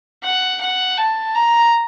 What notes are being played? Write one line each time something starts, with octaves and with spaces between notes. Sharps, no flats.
F#5
F#5
A5
A#5